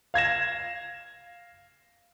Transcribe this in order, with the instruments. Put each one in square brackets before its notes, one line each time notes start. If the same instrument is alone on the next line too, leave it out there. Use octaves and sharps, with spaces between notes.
[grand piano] F5 G#6 A#6 E7